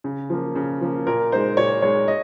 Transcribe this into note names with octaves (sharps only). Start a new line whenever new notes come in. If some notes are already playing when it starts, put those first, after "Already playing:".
C#3
F3 A#3
C#3
F3 A#3
A#2 A#4
G#3 D#4 C5
A#2 C#5
G#3 D#4 C#5
D#5